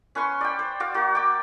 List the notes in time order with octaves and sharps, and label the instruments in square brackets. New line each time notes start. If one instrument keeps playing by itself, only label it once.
[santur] C#4 B4 C6 C#6
D5 G5
C5
F#4 D5 F5
A#3 F#4
G5 D6